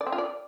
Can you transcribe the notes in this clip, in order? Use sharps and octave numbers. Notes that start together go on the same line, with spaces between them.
D5
C4
F4
D5